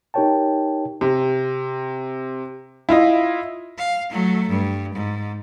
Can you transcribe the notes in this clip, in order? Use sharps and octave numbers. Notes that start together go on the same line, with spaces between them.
D#4 G4 A#4 C#5 G5 A5
C3
E4 F4 D#5
F5
F#3 A3
G2
G#2